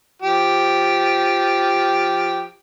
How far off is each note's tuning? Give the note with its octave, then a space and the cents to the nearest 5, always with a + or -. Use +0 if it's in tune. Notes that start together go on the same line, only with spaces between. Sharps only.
F3 +0 G4 +0